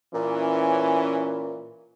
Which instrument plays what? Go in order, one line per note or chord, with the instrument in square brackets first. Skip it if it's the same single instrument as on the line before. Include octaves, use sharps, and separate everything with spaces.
[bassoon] A#2 [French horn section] E3 C#4